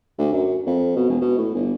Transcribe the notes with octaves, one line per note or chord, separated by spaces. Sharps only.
D2
F#2
F2
B2
E1
B2
A2
G1